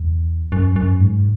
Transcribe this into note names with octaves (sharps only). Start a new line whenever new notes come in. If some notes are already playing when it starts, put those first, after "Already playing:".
Already playing: E2
F#2
F#2
G#2